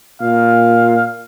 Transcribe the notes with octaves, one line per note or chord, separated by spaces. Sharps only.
A#2 F5